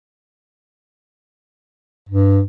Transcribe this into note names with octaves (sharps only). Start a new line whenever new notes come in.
G2